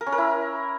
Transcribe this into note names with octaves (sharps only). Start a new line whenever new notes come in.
A#4
C#4
A#4
E4